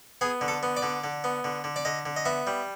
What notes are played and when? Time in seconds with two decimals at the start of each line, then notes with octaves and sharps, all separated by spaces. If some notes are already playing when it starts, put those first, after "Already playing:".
0.21 B3 G#4
0.41 D3
0.48 A4
0.63 B3
0.77 D5
0.82 D3
1.04 D3
1.24 B3
1.44 D3
1.64 D3
1.76 D5
1.85 D3 D#5
2.06 D3
2.16 D#5
2.26 B3 E5
2.47 G3